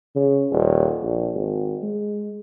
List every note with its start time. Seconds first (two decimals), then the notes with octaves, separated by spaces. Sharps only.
0.15 C#3
0.52 D#1
1.03 A#1
1.35 G#1
1.83 G#3